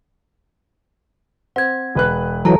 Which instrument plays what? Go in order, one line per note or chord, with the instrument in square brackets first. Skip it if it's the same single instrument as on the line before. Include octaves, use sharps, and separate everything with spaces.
[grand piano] C4 [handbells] F#5 G#6
[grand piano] E1 B4 F#6
[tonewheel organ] E3 F#3 [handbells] A4 A5 A#5